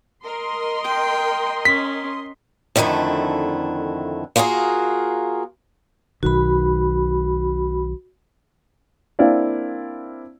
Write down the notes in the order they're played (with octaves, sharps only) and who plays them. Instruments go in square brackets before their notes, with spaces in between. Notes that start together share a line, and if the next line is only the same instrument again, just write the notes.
[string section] A#4 [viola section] D#5 C6
[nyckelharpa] G5
[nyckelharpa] C#4 [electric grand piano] B6
[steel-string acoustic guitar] F2 D3 D#3 A3 E4
A#3 F4 F#4 G#4 A#4
[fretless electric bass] B1 D#3 [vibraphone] F#4 B5
[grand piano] A#3 C4 D4 E4 D5 F5